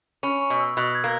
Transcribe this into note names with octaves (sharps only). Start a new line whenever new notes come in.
C#4 B5
C#6
B2
E6
B2 F#6
G#6
A#3